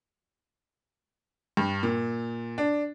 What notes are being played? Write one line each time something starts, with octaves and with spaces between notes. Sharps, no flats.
G2
A#2
D4